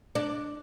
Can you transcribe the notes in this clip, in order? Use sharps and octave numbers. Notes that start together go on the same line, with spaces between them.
D4